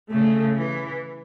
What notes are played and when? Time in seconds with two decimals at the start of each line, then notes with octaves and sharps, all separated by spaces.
0.11 C#3 A3
0.57 E3